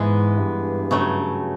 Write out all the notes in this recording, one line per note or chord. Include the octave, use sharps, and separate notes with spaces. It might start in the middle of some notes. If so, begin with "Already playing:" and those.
Already playing: G#2 E3 G#3 B3
G2
C#3 F#3 A3